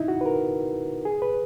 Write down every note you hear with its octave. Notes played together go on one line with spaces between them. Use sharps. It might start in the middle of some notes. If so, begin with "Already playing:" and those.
Already playing: D#4 E4
F#4
B4
A#4
G#4
B4